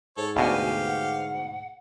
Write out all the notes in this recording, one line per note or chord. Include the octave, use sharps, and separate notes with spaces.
G#2 A4 C#5
D2 B2 G4 F5 G#5
F#5